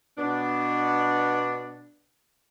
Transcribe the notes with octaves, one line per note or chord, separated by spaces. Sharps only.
B2 B3 D4